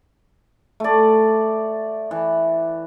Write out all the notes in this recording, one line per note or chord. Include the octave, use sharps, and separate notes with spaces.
A3 D5
E3